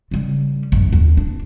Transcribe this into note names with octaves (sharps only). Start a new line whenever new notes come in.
C#3 G3
A1 F#2
D#2
D4